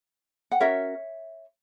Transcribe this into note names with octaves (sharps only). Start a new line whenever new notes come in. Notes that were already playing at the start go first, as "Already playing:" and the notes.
F#5
C#4 F#4 A#4 C#5 E5